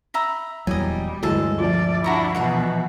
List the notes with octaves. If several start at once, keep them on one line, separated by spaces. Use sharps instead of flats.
E5 A#5 B5
D#1 E2 F#3 G3 D#5 G#5
D2 G2 E3 F#3 G#3 G#4 A4 A5
A#1 F3 D5
D4 E4 F#4 A#5 C#6
B2 E3 D#4 B4 F#5